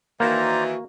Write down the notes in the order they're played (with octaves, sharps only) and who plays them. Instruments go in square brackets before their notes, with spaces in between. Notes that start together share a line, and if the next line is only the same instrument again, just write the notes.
[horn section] D#3 E3 [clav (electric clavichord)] A#3 [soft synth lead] F#4 [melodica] C5 D5 A#5